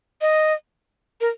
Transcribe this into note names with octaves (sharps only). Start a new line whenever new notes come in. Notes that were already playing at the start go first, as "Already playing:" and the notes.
D#5
A#4